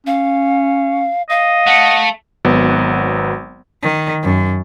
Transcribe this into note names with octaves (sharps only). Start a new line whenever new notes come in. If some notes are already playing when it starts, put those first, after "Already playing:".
C#4 F5
D#5 F5
A3 F#5
G#1 F#3 B3 F#5
D#3
F#2